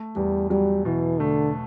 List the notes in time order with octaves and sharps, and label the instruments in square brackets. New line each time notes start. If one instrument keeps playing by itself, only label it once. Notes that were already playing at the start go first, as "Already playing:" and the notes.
Already playing: [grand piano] A3
[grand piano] E2 [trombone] G3
[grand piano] F#3 [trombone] G3
[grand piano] B2 [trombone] E3
[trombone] D3 [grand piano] A3